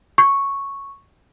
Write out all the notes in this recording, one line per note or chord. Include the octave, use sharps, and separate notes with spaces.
C#6